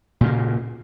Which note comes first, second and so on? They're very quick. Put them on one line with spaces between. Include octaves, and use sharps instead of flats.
A#2 C#3 A#3